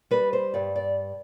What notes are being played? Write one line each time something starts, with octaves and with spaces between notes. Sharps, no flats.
G3 B4
C5
G2 D5
D5